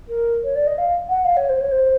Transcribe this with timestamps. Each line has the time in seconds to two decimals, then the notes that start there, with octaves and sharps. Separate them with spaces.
0.08 A#4
0.44 C#5
0.55 D5
0.67 D#5
0.78 F5
1.09 F#5
1.25 F5
1.37 C#5
1.49 C5
1.60 C#5
1.71 C5